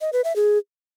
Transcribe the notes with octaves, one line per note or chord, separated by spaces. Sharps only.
D#5
B4
E5
G#4